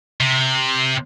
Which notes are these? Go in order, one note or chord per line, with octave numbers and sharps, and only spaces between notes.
C3